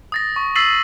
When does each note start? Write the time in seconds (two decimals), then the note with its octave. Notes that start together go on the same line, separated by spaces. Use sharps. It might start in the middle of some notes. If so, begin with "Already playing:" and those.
0.12 D#6 A6 A#6
0.36 C#6
0.55 E6 A6 B6 C7 D#7 F#7